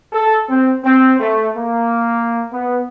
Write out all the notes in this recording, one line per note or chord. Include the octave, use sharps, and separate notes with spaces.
A4
C4
C4
A3
A#3
B3